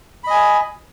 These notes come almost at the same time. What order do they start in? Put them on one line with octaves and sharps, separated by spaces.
B5 D#5 G#5